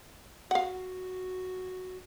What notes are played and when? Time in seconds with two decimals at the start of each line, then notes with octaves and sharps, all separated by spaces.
0.51 F#4 F5 F#5